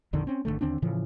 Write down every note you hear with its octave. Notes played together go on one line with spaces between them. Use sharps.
A#1 F2 D3 D#3
C4 C#4
G#1 E2 D3 A3
D#2 D3 C4 D4
A2 C#3 E3 F3